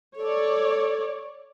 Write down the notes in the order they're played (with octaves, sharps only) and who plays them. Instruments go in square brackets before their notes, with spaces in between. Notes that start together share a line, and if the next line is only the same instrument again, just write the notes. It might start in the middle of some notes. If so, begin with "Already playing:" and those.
[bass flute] A4 [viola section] C#5 D5